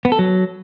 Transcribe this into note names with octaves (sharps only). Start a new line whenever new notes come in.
B3
A4
F#3